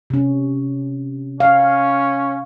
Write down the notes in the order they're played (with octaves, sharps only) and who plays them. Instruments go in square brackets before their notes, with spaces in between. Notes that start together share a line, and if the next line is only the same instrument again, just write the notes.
[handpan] C3 C#4
[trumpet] C#4 [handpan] F5